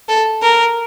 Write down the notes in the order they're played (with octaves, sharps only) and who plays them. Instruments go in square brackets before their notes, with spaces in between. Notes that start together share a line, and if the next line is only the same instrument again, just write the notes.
[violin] A4
A#4